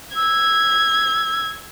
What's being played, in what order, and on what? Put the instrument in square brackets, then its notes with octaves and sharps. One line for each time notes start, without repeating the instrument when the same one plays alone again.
[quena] E6 [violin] G#6